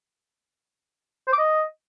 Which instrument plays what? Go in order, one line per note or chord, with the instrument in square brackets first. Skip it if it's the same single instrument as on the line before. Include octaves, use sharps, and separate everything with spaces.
[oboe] C5
D6
D#5